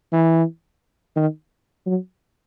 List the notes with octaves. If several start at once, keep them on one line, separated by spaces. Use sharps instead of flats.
E3
D#3
F#3